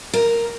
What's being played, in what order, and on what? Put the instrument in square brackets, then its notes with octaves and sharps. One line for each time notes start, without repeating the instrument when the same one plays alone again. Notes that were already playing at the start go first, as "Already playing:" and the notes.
[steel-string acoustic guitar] A#4